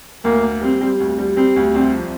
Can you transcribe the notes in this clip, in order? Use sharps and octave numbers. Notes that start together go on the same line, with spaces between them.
D2 A#3
A#3
G3 C4
G3
D2
G3
G3 C4
D2
C2 C4
F3